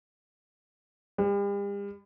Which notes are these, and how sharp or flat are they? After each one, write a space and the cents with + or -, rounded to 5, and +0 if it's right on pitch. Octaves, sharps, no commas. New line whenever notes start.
G3 +45